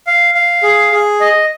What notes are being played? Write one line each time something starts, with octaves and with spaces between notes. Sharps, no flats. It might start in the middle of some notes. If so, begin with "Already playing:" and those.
F5
F5
G#4
G#4
D#5